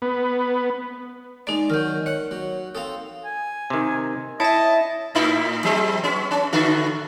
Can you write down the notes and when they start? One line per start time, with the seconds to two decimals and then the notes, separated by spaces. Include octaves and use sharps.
0.02 B3
1.47 G#3 D4 D#4 D5
1.70 D#3 F#3 F6 G6
2.06 C#5 F#5
2.31 F#3
2.75 C4 A4 F5 D#6
3.25 G#5
3.70 C3 D#3
4.40 E4 C#5 D#5 E5 A5
5.15 A2 D#4 E4
5.64 F#3 G#3 C4
6.04 B3 C#4
6.31 C#4
6.52 A2 D3 F#4